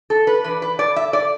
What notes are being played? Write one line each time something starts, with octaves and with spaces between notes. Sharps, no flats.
A4
B4
E3 D4 B4
B4
D5
E5
D5